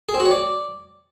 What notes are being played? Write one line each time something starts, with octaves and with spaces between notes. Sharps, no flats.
G#4
C4
F#4
C#5
D5